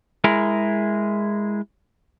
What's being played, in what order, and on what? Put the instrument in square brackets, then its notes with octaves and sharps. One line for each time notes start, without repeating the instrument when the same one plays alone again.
[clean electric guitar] G#3 E4 G#4 A#4